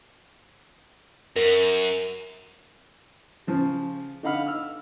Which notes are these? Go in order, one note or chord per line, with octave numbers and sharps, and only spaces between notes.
F#2 A#4
C#3 F3
D3 D#4 F5 F#5 B5 F6
E6 F6